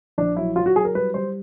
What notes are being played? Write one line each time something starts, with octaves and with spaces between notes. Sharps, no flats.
A#1 D4
F#3 E4
F#3 F4
F#4
F#3 G#4
A#4
G3 B4
G3 C5